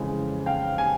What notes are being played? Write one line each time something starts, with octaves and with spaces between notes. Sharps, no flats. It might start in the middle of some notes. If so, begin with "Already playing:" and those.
Already playing: F2 C#3 E3 G#3
F5 G5
G#5